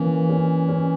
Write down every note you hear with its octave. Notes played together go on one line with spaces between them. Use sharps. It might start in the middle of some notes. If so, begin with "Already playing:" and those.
Already playing: E3 A#3 C#4
C#4
C#4